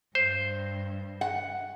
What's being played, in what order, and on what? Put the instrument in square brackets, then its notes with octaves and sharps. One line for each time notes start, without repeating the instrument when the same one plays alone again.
[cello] G2 [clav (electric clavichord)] C5
[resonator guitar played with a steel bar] F#5